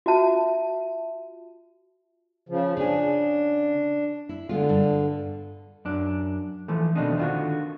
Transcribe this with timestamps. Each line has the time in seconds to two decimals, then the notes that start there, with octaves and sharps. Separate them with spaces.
0.06 F4 F#4 E5 A5
2.49 C#3 F3
2.77 C#3 D4 G#4
4.29 E4
4.49 D3 G#3 B3 F4
4.69 G2
5.85 F#2 D4
6.68 E3 F3 A3
6.95 B2 D#3 A3 C4 D4 D#4
7.18 D3 D#3 F4 F#4